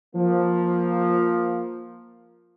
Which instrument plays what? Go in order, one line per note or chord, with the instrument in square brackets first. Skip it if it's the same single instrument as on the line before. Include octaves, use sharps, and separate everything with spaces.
[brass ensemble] F3 A#3